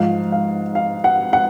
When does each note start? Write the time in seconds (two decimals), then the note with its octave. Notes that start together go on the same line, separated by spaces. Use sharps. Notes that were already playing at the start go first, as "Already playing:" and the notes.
Already playing: G#2 F3 F5
0.32 F5
0.75 F5
1.04 F#5
1.33 F#5